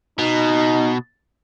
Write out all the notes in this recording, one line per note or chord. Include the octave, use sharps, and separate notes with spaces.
B2 D#4